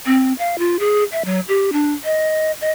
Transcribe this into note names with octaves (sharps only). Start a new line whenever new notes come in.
C4
F5
F4
G#4
E5
F#3
G4
D4
D#5
D#5